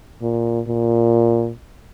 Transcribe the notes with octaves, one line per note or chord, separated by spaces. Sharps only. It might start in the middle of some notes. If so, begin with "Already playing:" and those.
A#2
A#2